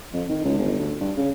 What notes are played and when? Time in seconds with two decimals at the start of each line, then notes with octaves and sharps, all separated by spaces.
0.13 F2
0.29 D#3
0.44 C#2
0.57 G1
0.79 D2
1.01 G2
1.17 C#3